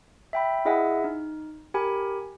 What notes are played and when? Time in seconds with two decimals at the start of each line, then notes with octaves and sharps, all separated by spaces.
0.33 E5 G5 B5
0.65 E4 G#4 D#5 E5 F#5 G#5
1.04 D#4
1.74 G4 A#4 G#5 B5